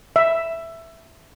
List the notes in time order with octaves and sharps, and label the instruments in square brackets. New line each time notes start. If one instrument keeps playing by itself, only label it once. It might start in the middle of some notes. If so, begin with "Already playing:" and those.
[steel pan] E5